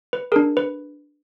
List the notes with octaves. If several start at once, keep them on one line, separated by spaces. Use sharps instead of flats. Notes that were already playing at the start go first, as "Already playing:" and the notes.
B4
D4 G#4 A#4
B4